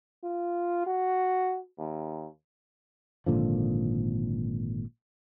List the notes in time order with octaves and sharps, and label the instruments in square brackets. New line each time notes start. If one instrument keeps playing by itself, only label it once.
[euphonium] F4
F#4
D#2
[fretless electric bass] G#1 A#2 D3 F3